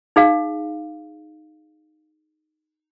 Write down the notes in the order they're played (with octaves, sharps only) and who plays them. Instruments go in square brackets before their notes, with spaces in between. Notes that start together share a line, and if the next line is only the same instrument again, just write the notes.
[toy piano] D#4 G#4 F5